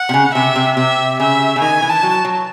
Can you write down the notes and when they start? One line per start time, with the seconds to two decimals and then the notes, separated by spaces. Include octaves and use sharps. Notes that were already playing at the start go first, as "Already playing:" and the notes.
Already playing: F#5
0.09 C3
0.14 C#3
0.29 C#3
0.35 C3 E5
0.55 C3
0.77 C3 E5
1.20 C#3 E5
1.56 C#3
1.61 D#3 G#5
1.82 E3
1.89 A5
2.03 F#3
2.25 F#3